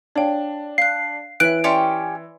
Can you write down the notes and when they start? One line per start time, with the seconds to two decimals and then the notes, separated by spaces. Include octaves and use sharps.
0.16 D4 C#5 F5 G5
0.78 F5 F#6 C7
1.40 E3 B4 C#5 E5 F#6 D7
1.64 C#4 G4 D5 E5 C6 C#6